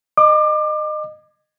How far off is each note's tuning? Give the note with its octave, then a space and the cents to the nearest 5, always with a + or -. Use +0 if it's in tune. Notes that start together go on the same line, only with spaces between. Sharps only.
D#5 -25 D6 +25